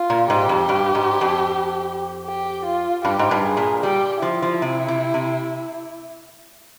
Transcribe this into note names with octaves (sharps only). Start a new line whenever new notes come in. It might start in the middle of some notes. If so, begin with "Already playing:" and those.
Already playing: F4
A#2
G#2 G4
F2
G2
G#2
F2
G4
F4
G2 G4
G#2
G2
G#4
A#2
G3 G4
F3 E4
F3
C3
C3
C3